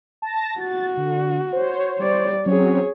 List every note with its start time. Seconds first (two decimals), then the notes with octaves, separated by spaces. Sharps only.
0.22 A5 A#6
0.60 F#4 A6
0.97 D3
1.53 C5 C#5
1.98 G3 D5
2.46 F#3 C4 C#4 G#4 C#5